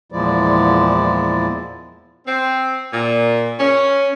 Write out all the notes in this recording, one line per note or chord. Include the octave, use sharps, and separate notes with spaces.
E2 A#2 F3 G#3 E4 D5
C4
A#2
C#4